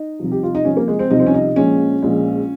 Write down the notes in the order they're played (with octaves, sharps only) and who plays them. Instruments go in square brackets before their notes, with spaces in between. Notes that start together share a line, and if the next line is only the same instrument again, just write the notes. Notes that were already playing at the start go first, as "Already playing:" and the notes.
Already playing: [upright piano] D#4
C2 C3 F3
G4
F4
D#4
C2 C3 F3 C#4
A#3
G#3
C4
C2 C3 F3 D#4
C4
C#4
D#4
A#1 A#2 G#3 C#4
A#1 A#2 G#3